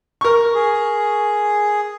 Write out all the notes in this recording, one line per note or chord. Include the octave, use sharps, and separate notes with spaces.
A#4 C#6
G#4